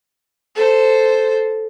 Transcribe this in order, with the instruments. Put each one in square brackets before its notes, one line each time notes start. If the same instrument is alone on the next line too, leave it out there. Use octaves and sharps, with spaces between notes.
[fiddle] A4 C5